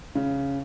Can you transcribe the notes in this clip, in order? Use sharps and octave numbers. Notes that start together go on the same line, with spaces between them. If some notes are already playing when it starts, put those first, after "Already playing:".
C#3